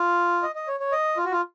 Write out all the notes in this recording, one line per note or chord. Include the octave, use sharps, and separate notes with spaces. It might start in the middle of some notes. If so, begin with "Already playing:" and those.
Already playing: F4
D#5
D#5
C#5
C#5
D#5
F4
F#4
F4